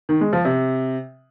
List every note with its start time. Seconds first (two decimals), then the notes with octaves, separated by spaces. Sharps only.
0.09 D#3
0.21 G#3
0.33 F3
0.45 C3